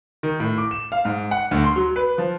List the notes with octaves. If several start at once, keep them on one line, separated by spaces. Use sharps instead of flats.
D#3
A2
D6
E7
F5
G#2
F#5
D2
C6
F#3
B4
F3